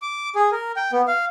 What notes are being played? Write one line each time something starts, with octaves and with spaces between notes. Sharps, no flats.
D6
G#4
A#4
G5
B3
F5